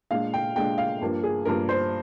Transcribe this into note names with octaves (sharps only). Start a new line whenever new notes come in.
A#2 G#3 D4 F5
G5
A#2 G#3 D4 G5
F5
G2 F3 A#3 D4
G#4
G2 F3 A#3 D4 A#4
C5